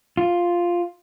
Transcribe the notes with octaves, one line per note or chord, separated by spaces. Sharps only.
F4